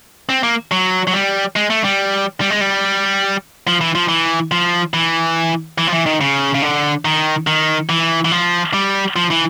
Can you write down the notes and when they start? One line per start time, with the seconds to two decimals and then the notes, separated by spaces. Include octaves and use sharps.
0.29 C4
0.43 A#3
0.72 F#3
1.07 F#3
1.14 G3
1.56 G#3
1.70 A3
1.84 G3
2.41 G3
2.50 G#3
2.61 G3
3.67 F3
3.81 E3
3.95 F3
4.08 E3
4.51 F3
4.94 E3
5.78 E3
5.87 F3
5.93 E3
6.06 D#3
6.21 C#3
6.54 C#3
6.62 D3
7.05 D#3
7.47 D#3
7.89 E3
8.25 E3
8.32 F3
8.74 G3
9.16 F3
9.30 E3